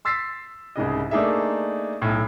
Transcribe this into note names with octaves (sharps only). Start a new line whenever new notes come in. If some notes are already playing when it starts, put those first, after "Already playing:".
C6 E6 A6 B6 C7
C2 G#2 C#3 D#5
A3 A#3 D4 D#4 G#4 E5
B1 A2